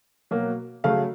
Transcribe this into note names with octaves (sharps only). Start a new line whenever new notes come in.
B2 F#3 A#3
C#3 F#3 A3 F5